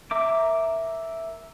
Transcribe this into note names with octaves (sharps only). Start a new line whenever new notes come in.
A#4 E5 D6